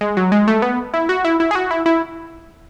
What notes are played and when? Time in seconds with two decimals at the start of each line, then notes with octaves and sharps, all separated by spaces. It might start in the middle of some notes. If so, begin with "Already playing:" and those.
0.01 G#3
0.17 F#3
0.32 G#3
0.48 A3
0.62 B3
0.94 E4
1.09 F#4
1.25 E4
1.40 E4
1.51 G#4
1.55 F#4
1.71 E4
1.86 E4